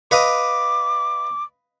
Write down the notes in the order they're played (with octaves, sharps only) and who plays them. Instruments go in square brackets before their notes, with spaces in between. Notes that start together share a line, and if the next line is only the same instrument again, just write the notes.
[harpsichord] B4 D#5 F5 [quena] D6